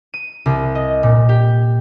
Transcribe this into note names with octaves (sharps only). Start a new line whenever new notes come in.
D#7
C2
D#5
A#2
G4